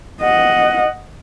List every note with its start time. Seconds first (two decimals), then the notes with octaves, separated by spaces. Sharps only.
0.22 D#5 F#5